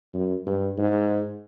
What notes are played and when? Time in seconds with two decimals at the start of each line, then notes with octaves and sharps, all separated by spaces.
0.14 F#2
0.47 G2
0.78 G#2